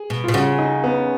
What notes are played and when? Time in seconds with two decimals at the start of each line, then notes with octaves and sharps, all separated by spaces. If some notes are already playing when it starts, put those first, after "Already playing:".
Already playing: G#4
0.10 B2
0.24 B2 F4
0.34 C#3 F#4
0.58 D#4
0.84 B3